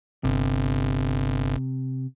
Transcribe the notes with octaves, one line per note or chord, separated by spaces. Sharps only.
G1 C3